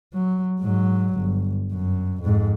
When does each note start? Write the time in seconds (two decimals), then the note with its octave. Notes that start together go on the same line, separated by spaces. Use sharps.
0.14 F#3
0.60 G#2 F#3
1.15 G1
1.72 F#2
2.22 F2 G#2